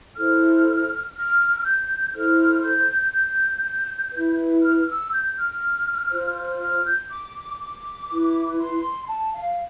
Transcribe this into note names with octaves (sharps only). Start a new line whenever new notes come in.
E4 A4 C5 F6
F6
F6
G6
E4 A4 C5 F6
G6
G6
E4 B4
F6
E6
G6
F6
F4 C5
F6
G6
D6
D6
E4 B4
C6
A5
F5